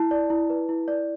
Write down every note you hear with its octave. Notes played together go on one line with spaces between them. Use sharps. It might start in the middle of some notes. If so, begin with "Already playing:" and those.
Already playing: E4 A5
D5
E4
B4
E4
D5